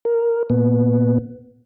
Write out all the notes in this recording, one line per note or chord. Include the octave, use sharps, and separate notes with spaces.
A#4
A#2 B3